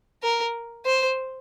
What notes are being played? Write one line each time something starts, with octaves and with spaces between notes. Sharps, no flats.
A#4
C5